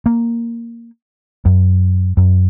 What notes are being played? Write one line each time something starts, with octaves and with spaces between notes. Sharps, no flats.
A#3
F#2
F#2